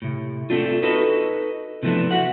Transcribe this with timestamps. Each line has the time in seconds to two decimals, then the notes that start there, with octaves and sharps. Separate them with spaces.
0.02 A2 C3
0.50 A3 C4 D4 F4
0.82 D#4 F#4 A4 B4 D#5
1.83 C3 E3 F3 A3 B3 D4
2.11 F#4 E5 F#5